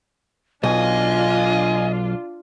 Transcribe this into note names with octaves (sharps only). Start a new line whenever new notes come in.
B1 D4 F4 D#5 G#5